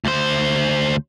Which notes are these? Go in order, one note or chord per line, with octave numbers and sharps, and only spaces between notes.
D2 C5